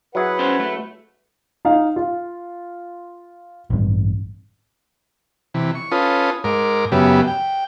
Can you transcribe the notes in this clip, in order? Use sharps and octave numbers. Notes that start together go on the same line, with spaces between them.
F#3 E4 G#4 B4 F#5
C#4 C5
A3
D#4 F5
F4
A1 G2
C3 E3
C#6
C#4 F4 A4 B4 D#6
G#2 A#4 D6
F#2 C#3 B3 G4 E5
G5